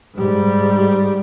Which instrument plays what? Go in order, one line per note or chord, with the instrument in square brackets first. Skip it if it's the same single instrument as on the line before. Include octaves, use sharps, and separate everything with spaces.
[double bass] G#2 G3